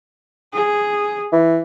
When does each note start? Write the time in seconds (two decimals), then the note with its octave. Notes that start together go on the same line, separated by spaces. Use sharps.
0.54 G#4
1.32 E3